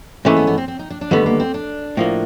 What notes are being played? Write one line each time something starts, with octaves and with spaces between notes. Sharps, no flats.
G#2 E3 A3 A#3 C#4
B3
B3
C4
C4
D#4
D4
D4
D#2 D3 G3 A3 B3
A#3
C4
D4
A2 F3 A#3